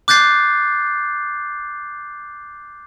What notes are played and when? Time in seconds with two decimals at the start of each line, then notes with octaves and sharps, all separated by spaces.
0.08 D6 F#6 G6 A6 C7